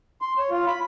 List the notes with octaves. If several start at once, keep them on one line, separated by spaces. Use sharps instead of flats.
C6
C#5
F4
B5